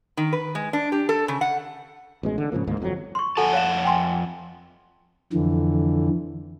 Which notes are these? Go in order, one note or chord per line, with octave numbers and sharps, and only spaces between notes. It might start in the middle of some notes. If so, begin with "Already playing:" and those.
D#3
B4
G#3
D4
G4
A4
C#3
F#5
A1 B2 G#3
D3
G#2 C#3 F3 A#3
D2 G#2 D#3 A#3
G1 F2 C#3 F#3
C6 C#6
F2 F#4 A4 F#5 G#5 A5
C#5 F5 E7
G5 G#5 C6
F2 D3 E3